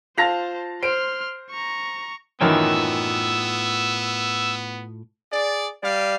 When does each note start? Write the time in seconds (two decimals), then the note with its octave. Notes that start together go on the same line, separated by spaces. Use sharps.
0.18 F4 C5 F5 A5 A#6 F7
0.83 C5 C6 F6 D7
1.50 A#5 C#6
2.41 F#2 A2 D#3 E3 B3 F4 G5 E6
5.32 G#4 D5
5.82 G3 D5 F5